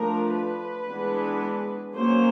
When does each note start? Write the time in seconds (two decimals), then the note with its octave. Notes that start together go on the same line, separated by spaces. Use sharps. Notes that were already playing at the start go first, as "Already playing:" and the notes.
Already playing: F3 A3 D4 A#4
0.32 B4
0.87 E3 G#3 B3 D4
1.96 F#3 A#3 C#4 C5